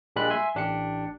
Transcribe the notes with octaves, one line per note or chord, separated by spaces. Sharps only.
A#1 A#2 G3 G#3 B5 F#6
E5 G#5 C6
A1 D4 G4 C#7